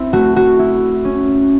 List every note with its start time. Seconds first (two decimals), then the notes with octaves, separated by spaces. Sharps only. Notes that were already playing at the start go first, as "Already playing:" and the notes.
Already playing: C4 E4
0.13 A3 F#4
0.36 F#4
0.59 E4
1.05 C#4